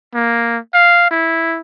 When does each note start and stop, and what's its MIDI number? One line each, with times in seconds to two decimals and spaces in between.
0.14 0.58 58
0.74 1.10 77
1.11 1.61 64